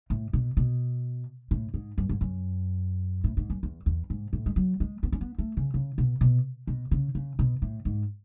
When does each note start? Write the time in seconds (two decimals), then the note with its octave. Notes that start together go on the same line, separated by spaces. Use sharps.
0.10 A2
0.33 B2
0.57 B2
1.51 A2
1.74 G#2
1.98 F#2
2.09 G#2
2.21 F#2
3.24 A2
3.37 G#2
3.50 F#2
3.63 E2
3.86 E2
4.10 G#2
4.33 A2
4.46 G#3
4.56 F#3
4.80 G#3
5.03 B3
5.12 C#4
5.21 B3
5.38 A3
5.57 C#3
5.74 C#3
5.98 B2
6.21 B2
6.67 B2
6.91 C#3
7.15 C#3
7.39 B2
7.62 A2
7.85 G#2